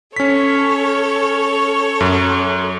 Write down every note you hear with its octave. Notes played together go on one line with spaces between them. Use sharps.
C#4 A4 C#5 B6
F#2